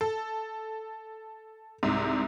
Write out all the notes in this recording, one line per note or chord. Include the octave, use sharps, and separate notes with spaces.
A4
C2 G#2 C3